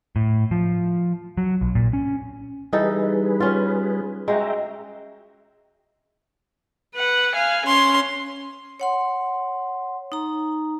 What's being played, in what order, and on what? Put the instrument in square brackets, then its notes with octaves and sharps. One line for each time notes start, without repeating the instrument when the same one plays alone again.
[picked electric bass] A2
F3
F#3
B1
A#2
C#4
[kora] E3 D#4 A4 [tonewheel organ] G3 G#4 B4
[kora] C#4 F4
[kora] G#3 F#4 [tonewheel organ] E5 G5 A#5
[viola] B4 F#5
F5 G#5
[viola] C#4 [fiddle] C6
[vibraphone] C#5 F#5 C6
D#4 A#5